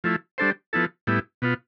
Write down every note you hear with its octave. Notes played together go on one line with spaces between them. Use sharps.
F3 A3 E4
G3 D4 A4 C5
F3 B3 E4 A4
A2 G3 B3 E4
B2 B3 F4